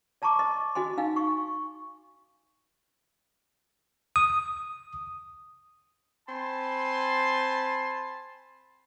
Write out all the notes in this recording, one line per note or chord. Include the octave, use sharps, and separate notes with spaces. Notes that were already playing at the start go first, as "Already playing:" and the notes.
D5 A5 A#5 C#6 D6
D#5
F#4 D#5 G#5 C6
D#4 F5 G#5
C#6
D#6
C4 G#5 A5 B5 C6